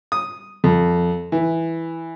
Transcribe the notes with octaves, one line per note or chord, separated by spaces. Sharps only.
D#6
F2
E3